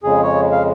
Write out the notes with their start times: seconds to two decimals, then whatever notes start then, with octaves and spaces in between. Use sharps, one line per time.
0.03 F2 C#3 G#3 G#4
0.23 C#5
0.52 F5